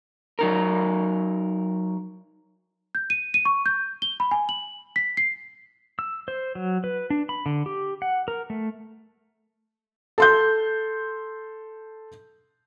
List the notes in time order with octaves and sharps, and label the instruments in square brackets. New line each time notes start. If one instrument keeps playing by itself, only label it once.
[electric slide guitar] F#3 D#4 A#4
[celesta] G6
D#7
D#7
C#6
G6
G7
B5
G#5
F#7
B6
C7
[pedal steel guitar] E6
C5
F#3
B4
D4
B5
D3
G4
F#5
A#4
A3
[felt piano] A4 C6 G6